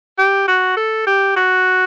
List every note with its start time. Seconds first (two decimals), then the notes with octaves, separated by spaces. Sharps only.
0.18 G4
0.48 F#4
0.77 A4
1.06 G4
1.36 F#4